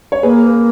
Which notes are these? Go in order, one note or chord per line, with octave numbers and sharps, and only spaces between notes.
C#5
A#3 G#4 B4
B4